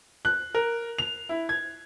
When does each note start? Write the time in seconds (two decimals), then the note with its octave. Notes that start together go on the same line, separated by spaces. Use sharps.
0.25 F#6
0.55 A#4
0.98 F7
1.29 E4
1.49 G#6